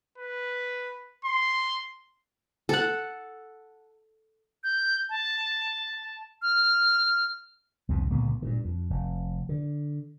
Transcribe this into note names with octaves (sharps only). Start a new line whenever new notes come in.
B4
C6
A4 F#5
G6
A5
F6
C2 F2 G#2 B2
C#2 A#2 D3 B3
G2 A#2 D#3
F2
F1
D3